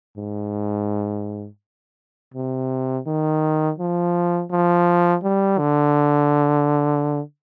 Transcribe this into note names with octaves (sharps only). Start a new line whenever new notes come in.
G#2
C3
D#3
F3
F3
G3
D3